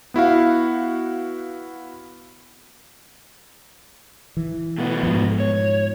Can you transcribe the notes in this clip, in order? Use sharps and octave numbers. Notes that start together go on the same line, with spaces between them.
B3 E4 F#4 F5
E3
B2 A3 B3
G#2 F3
C#5